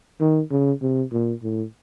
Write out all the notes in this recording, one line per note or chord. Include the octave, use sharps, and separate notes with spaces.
D#3
C#3
C3
A#2
A2